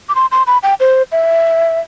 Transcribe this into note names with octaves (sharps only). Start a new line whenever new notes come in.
D6
C6
C6
B5
G5
C5
E5